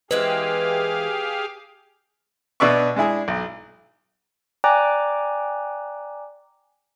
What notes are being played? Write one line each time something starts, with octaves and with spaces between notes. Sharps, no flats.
E3 G#3 C4 G4 G#4 B4 F5
B2 D4 B4 D5 E5 C#6
G#3 D4 E4 G#4
B1
D5 G5 G#5 A#5 D6 F#6